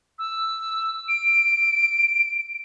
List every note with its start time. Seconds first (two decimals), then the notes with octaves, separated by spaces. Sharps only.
0.19 E6
1.08 D7